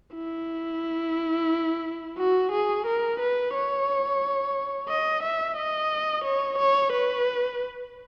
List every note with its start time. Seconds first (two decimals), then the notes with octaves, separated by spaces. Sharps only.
0.14 E4
2.18 F#4
2.52 G#4
2.86 A#4
3.20 B4
3.54 C#5
4.89 D#5
5.23 E5
5.57 D#5
6.24 C#5
6.58 C#5
6.92 B4